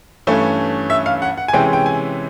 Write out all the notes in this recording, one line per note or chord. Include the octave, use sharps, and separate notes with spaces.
G2 E3 A3 C#4
E5
F5
F#5
F#5
G#5
C3 E3 G#3 C#4 G5
G5
G#5